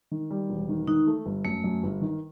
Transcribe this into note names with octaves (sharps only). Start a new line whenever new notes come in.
D#3
G3
E1
D#3
D#3 D#4
A3
G1
F#2 A3
F#2
G1
D#3